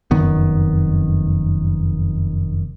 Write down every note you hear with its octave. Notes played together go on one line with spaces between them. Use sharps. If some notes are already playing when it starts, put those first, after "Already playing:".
F1 F#2 D#3 B3